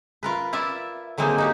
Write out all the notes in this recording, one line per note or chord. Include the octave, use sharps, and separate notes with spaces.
F4 A#4 B4
E4 F4 D5 E5
D3 F#3 G#3 A#3 C4 D#4
D#4 F#4 G4